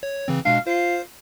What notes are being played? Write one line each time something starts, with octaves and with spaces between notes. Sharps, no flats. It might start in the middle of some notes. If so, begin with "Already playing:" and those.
C#5
C#3 E3 C4
B2 G#3 D4 F5
F4 C5 C7